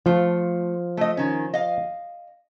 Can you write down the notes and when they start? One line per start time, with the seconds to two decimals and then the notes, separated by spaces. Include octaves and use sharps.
0.06 F3 A3 F4
0.97 A3 D#5
1.17 D#3 C#4
1.54 D#5 F5